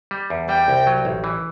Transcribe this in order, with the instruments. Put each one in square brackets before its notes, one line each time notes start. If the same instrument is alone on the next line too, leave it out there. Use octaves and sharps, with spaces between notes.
[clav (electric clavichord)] G3
E2
[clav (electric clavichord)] G3 [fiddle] G5
[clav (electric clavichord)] C2
F#3
A1
E3